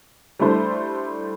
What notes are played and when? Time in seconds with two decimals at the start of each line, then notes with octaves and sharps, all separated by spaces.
0.39 G3 A3 D4 E4 C5